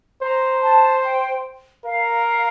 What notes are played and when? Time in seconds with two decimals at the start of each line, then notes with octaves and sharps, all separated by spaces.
0.22 C5 A#5
0.63 A5
1.04 G5
1.84 A#4 F5